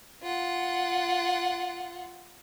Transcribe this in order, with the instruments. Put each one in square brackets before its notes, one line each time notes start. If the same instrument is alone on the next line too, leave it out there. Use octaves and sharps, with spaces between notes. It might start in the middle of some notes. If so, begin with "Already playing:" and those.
[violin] F4 F#5